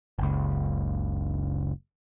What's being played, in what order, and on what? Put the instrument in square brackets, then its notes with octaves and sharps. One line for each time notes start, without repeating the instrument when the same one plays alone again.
[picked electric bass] F#1 C#2